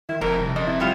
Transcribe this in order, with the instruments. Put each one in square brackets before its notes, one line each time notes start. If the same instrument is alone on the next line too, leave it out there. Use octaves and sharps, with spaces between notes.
[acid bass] D#3 [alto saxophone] E4
[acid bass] F1 [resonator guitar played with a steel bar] F2 [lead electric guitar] G#4 G5 [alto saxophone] A#4
[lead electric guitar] C2
[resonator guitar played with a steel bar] F2 [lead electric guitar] C#4 D5 [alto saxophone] D#5
[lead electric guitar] F3 C4 [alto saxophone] E4
[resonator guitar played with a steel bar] F#3 G3 F4